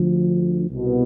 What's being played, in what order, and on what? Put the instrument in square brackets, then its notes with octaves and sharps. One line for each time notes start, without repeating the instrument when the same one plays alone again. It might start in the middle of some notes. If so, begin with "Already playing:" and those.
Already playing: [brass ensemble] D2 D3 F3
C2 B2